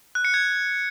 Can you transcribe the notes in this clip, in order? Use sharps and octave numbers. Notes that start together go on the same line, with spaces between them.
F#6
C#7
G#6